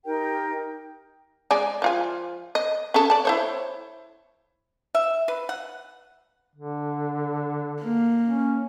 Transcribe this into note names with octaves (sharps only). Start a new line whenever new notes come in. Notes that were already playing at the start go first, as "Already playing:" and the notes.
D#4 G4 A#4 G5
G#3 D5 G#5
F3 F4 G#5
D#5
C#4 G#4 A4
D5 A5
E4 C5 C#5
E5
B4
F#5
D3
A#3
C#4